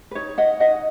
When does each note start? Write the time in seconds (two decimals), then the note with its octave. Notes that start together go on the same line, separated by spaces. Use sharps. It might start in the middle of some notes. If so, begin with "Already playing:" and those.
0.11 B4
0.15 D#4 C#5
0.38 D#5 F#5
0.60 D#4 D#5 F#5